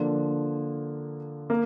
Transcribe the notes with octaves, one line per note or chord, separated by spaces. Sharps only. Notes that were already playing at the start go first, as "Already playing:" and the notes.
Already playing: D3 F3 A#3 D4
A#3